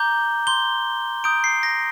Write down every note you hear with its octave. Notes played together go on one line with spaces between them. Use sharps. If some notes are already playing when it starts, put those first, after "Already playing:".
Already playing: A#5 D6 G6 G7
C6 G6 G7
A#5 D#6 G6 D7
C7
A#6